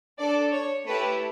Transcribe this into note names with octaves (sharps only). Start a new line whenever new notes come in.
D4 A4 D5
C#5
A3 E4 G4 B4